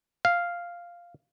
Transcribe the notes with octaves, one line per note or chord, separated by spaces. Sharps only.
F5